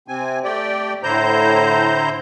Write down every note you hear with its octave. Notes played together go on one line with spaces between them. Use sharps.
C3 C4 G#5
A3 G4 D5 G5
A2 D3 E4 C5 A#5 G6